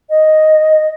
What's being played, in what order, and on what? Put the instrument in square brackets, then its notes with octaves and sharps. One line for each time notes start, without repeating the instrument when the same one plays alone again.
[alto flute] D#5